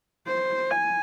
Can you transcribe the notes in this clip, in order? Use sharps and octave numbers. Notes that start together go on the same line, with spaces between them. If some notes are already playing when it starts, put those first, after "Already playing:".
C5
G#5